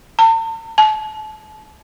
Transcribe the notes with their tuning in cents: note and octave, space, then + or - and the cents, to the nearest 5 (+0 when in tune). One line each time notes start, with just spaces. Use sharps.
A5 +45
A5 -30